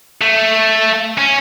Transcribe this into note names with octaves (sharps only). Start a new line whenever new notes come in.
A3
C#4